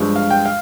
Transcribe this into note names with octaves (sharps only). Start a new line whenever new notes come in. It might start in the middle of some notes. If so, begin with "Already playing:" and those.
Already playing: G2 F3 G#3
F5
G5
F5